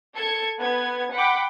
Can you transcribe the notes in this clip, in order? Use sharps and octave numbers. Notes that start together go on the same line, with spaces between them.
A4 G#6 C#7
B3 G#6
F#5 G5 B5 D6